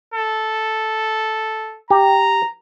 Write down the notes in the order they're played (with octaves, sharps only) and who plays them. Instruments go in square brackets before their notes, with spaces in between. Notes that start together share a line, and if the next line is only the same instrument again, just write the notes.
[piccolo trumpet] A4
[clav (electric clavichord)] G4 [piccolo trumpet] A#5